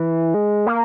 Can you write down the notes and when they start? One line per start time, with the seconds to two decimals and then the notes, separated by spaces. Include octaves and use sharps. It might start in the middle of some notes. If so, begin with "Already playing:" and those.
Already playing: E3
0.34 G#3
0.67 A#3